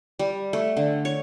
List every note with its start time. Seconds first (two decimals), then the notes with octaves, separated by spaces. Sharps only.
0.19 G3
0.53 A3
0.77 D3
1.05 C#5